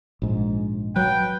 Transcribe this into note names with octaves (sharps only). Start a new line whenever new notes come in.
A#1 G#2
F#3 B4 G5